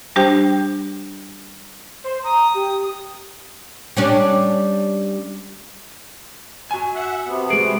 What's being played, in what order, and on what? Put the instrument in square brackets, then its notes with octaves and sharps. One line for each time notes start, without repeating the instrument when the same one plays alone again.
[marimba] G3 D4 G4 C5 G5
[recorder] C5
[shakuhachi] A#5 [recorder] D#6
[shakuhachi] G4
[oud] G3 C#4 D4
[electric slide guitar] F#4 G#5
[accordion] E5 F#5
C3 B3
[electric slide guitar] G#3 F#4 G#4 [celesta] D7